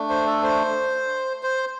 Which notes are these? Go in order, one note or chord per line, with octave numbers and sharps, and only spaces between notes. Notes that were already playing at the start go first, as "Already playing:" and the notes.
Already playing: A3 D4
C5
A4
C5
C5